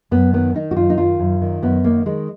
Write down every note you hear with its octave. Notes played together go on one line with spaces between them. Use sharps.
F#2 B3
D#3 B3
D#3 D#4
F#4
F#2 F4
D#4
D#3 F4
F#2
D#3
F#2 B3
D#3 A#3
D#3 G#3